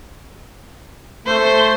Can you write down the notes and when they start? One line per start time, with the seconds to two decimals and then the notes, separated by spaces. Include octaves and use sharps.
1.26 A3 C5